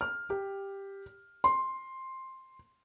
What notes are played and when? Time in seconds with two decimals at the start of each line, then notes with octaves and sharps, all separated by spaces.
0.01 F6
0.30 G4
1.44 C6